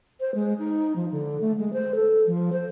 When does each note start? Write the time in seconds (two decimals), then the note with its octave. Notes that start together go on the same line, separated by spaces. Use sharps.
0.20 C5
0.35 G#3
0.59 D#4
0.96 F3
1.12 D3
1.41 A3
1.58 G#3
1.73 C5
1.95 A4
2.26 F3
2.53 C5